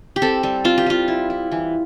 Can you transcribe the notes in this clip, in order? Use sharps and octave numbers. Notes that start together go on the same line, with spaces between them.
G4
C4 A4
G3
C4 F4
G4
G3 F4
E4
E4
E3